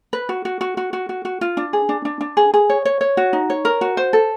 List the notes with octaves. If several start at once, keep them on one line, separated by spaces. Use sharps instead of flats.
B4
F#4
F#4
F#4
F#4
F#4
F#4
F#4
F4
D4
G#4
D4
D4
D4
G#4
G#4
C#5
C#5
C#5
F#4
D#4
C#5
A#4
F#4
C5
A4